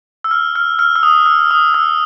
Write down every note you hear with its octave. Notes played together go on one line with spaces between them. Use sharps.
E6
F6
F6
F6
E6
D#6
E6
D#6
E6